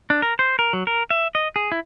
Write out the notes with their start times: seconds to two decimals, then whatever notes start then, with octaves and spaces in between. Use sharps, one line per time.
0.10 D4
0.22 A#4
0.39 C5
0.59 A#4
0.73 F#3
0.87 A#4
1.10 E5
1.35 D#5
1.56 G#4
1.72 E4